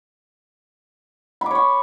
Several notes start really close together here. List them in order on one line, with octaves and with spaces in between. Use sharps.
B5 D6 C#5 C#6